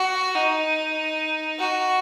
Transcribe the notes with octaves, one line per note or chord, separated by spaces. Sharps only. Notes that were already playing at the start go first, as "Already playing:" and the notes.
Already playing: F#4
D#4
F#4